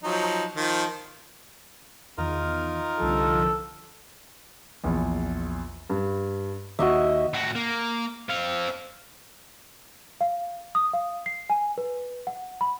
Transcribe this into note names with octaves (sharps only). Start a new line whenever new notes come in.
F3 F#3 D#4
D#3 F3
E2 D#3 D#4 F4 A#4
C2 D3 F3 A4
A#1 E2
G2
D#2 F#4 D#5 E5
A2 F#4
A#3
C4 F5
F5
D#6
F5
C7
G#5
B4
F#5
B5